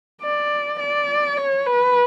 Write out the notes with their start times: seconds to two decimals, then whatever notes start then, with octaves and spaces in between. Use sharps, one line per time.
0.22 D5
0.80 D5
1.37 C#5
1.66 B4